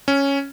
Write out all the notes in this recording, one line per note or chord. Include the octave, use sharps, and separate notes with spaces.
C#4